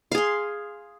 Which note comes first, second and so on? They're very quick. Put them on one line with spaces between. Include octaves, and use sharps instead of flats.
F5 G#4 C6